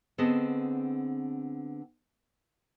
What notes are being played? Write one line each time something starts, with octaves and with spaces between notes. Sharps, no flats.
D3 B3 C4 G#4 D#5 A5